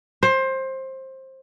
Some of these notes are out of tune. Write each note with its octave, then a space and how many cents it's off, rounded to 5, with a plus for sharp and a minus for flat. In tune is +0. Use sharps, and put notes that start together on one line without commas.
C5 +20